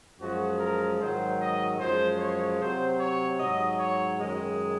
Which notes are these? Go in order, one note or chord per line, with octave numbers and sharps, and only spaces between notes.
F#2 F3 G#3 F#4
A#4
G#2 D#3 F#3 C5
D#5
F#2 F3 G#3 C5
C#5
C3 F#3 C5
C#5
G#2 F#3 D#5
C#5
F#2 D#3 G#3 D#5